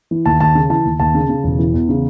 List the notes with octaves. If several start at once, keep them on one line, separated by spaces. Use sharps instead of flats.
E3
D#2 A5
D#2 A5
C#3
E3 A5
D#2
D#2 A5
C#3
C#3
E1
E3
E2
C#3